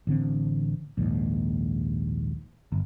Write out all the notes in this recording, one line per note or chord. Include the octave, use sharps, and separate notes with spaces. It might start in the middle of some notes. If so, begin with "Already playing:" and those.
A1 D3 C4
A#1 D#2 G#2
G1